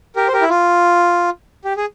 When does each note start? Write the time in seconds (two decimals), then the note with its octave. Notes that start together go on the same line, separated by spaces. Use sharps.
0.16 G4 A#4
0.28 C5
0.33 G4 A#4
0.41 E4
0.49 F4
1.65 G4
1.77 G#4